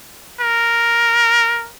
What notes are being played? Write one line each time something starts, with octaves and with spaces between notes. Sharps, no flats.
A#4